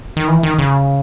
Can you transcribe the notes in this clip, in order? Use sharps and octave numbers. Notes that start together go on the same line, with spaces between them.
D#3
E3
D#3
C#3